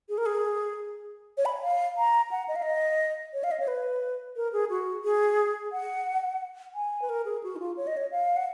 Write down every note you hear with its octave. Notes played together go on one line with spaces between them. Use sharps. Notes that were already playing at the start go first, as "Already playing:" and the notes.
G#4
A#4
G#4
C#5
B5
F5
A#5
F#5
D#5
F5
D#5
C#5
F5
D#5
C#5
B4
A#4
G#4
F#4
G#4
F#5
G#5
B4
A#4
G#4
F#4
D#4
F4
C#5
D#5
C#5
F5
F#5